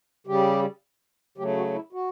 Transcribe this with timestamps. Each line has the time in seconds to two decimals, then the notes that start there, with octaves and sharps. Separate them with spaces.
0.27 C#3 G3 G4
1.38 C#3 F#3 A3 G4
1.57 F#4
1.75 E4
1.93 F#4